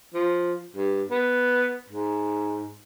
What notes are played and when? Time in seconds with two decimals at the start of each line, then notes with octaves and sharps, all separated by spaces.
0.14 F3
0.76 G2
1.10 B3
1.90 G#2